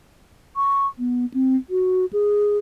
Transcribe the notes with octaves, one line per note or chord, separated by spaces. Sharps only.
C#6
B3
C4
F#4
G#4